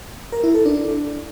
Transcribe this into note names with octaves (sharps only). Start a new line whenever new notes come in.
A#4
E4
A4
D4